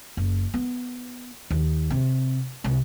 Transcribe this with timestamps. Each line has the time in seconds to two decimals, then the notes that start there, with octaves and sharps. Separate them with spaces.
0.17 F#1
0.54 B3
1.51 D#2
1.90 C3
2.64 C2